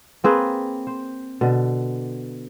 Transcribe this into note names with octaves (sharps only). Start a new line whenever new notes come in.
A#3 C4 G#4 B4
C5
B2 D3